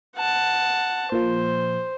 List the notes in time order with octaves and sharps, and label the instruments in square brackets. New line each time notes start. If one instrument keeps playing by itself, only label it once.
[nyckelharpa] F#5 A5
[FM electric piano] A#2 F3 [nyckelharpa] C5